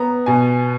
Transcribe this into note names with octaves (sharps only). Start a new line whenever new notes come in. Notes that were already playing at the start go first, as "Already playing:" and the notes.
Already playing: B3 A#5
B2 G#5